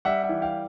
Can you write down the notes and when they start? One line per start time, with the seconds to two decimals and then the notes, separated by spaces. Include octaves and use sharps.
0.05 G3 E5 F#5
0.23 E5 F#5
0.29 E3
0.42 F5 G5